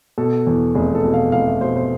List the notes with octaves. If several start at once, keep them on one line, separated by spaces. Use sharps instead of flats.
B2 A4
E2
F1 G#4
A4
B2
F5
F1 F5
E5
B2 C5
C5